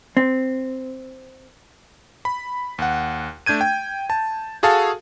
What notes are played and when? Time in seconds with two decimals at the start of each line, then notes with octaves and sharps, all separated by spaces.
0.17 C4
2.25 B5
2.78 D#2 F#5
3.46 A3 D4 G6 G#6 D#7
3.61 G5
4.10 A5
4.63 F#4 G#4 A4 F5 A5